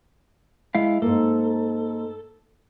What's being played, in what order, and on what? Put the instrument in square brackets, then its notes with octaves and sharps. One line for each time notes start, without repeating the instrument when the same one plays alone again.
[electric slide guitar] G#3 E4 F5
[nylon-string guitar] G#2 A#3 [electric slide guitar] A4